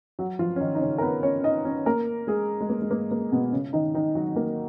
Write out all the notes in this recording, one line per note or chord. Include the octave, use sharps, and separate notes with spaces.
F#3 F#4
F3 F4
C#4
D#3 D#4
D#4
C#3 C#4
A#4
B3 B4
C#4 C#5
D#4 D#5
C#4 C#5
A#3 A#4
G#3 G#4
G#3
A#3
G#3
A#3
A#3
B2 B3
C#3 C#4
D#3 D#4
D#3 D#4
F#3 F#4
A#3 A#4